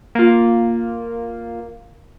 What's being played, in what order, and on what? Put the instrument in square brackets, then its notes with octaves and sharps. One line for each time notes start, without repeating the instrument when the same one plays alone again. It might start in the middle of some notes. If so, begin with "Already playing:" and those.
[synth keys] A#3 F4